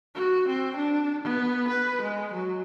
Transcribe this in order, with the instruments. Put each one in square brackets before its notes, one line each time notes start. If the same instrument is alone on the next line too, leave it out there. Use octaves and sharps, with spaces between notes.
[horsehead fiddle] F#4
C4
D4
B3
B4
G#3
F#3